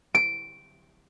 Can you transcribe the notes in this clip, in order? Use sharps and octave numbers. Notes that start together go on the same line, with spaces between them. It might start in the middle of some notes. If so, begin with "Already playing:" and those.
D7